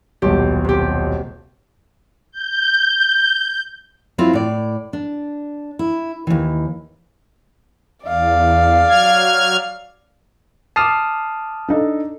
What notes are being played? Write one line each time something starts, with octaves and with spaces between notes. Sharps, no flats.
D#1 B1 G4
C3 G4
G6
F#3 C4 E4 F4
A2 D5
D4
E4
D#2 E3
E2 D5 F5
F#3 F6 G#6
A5 D6 D#6 F6 C7
D4 D#4 A4